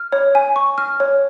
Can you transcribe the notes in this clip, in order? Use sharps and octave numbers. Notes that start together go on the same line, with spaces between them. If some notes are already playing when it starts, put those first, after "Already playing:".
Already playing: F6
C#5
G#5
C#6
F6
C#5